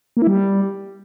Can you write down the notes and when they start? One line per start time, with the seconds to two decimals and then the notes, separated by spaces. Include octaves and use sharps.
0.17 A#3
0.22 E4
0.27 G3